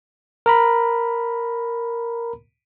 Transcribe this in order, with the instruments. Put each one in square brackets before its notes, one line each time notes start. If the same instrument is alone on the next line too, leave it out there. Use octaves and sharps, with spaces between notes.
[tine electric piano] A#4 A#5 B5